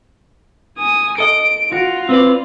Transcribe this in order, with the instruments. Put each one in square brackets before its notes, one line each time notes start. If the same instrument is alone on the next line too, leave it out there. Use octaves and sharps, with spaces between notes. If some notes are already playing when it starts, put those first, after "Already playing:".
[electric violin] G#5 D#6
[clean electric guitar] A4 D#5 [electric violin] D7
[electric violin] F4 [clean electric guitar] F#4
[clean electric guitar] C4 B4 D5